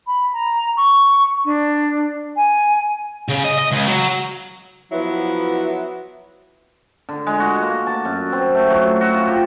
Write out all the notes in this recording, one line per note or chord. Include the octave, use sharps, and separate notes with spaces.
B5
A#5
C#6
D4
G#5
C#3
D#5
D#5
C#2
F#3
F3 F#3 B3 E4
D3
G#3
F#4
A#3
A5
F#2
C4
A3
F#3
F#4
F4
G4